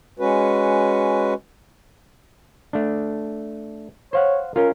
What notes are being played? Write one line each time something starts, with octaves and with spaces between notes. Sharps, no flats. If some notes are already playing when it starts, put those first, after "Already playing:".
G#3 C#4 F#4 B4
A3 D4
C5 C#5 F5 F#5
C#4 F4 A#4